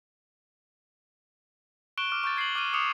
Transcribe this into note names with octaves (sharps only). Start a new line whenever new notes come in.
C#6 F#6 D7 E7 G7
D6 F6
C#6 G6 A6
G#6 C7 D7 F#7
D6 F6 D#7 F#7
D6 D#6 C#7 E7 F7